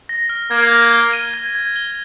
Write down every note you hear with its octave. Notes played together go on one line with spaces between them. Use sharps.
A#6
F6
A#3 G#6
G#6
G7
D#7
G#6
G#6
G7